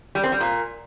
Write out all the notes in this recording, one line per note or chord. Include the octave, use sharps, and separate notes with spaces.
G3
C4
G3
A#2